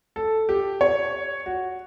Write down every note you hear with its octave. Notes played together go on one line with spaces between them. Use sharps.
A4
G4
C#5
F#4